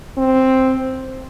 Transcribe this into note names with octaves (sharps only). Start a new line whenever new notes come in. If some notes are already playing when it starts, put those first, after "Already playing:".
C4